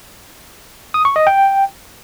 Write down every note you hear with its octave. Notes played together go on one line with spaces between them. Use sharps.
D#6
C#6
D#5
G5